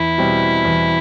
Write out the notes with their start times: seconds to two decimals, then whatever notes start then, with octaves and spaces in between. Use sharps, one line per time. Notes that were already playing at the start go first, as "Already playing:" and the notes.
Already playing: E2 E4
0.18 B2 G3 C4
0.65 E2